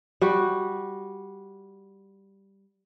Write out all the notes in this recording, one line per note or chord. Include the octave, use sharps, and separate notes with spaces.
G3 F#4